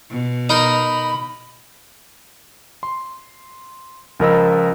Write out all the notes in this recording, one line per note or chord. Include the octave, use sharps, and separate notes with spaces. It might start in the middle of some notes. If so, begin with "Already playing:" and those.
B2
D#4 A#4 B5
C6
C#2 F3 A#4 D#5 B5 E6